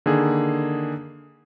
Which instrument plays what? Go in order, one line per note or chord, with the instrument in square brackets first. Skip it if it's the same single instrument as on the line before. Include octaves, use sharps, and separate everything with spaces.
[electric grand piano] D3 D#3 A#3 G#4